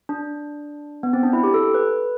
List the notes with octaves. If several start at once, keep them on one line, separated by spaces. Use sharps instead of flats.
D4
B3
C4
D4
E4
G4
A4
B4